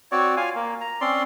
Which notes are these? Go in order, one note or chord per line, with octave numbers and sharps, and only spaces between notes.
C4 F#4 C#5 D5
F4 F5 G#5
A#3
A#5
C4 C#4 D5 C6